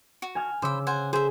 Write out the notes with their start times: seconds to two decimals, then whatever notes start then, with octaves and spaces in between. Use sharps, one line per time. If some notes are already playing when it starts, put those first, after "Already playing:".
0.22 F#4
0.35 G#5 F6 G#6
0.62 C#3 C5 B5 D6 E6
0.87 C5 F#5 G#5
1.13 G#4 C5 E5